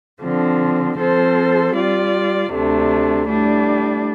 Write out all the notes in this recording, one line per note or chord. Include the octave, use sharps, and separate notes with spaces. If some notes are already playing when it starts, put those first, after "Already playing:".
D3 F3 C4
F3 C4 A4 C5
G3 F4 D5
D2 C3 A3 D4
A2 G3 D4